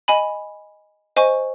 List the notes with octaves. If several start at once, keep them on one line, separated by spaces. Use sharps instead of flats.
D#5 G#5 B5
C5 D#5 G#5 C#6